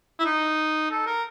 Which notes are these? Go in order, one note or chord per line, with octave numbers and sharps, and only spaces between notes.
E4
D#4
A4
A#4